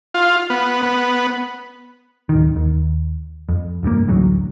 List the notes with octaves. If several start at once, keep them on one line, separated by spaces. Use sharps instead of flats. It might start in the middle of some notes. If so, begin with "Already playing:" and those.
F4
B3
B3
D1 D#3
D#2
F2
F1 G2 D3 A#3
A1 D2 F#3